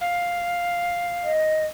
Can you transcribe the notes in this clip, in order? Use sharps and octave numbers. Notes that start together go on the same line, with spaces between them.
F5
D#5